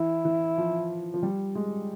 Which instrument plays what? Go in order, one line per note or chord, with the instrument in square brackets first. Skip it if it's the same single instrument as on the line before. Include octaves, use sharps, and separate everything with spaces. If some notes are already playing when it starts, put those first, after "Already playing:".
Already playing: [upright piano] E3 [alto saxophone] E4
[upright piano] E3
F3
F3
G3
G#3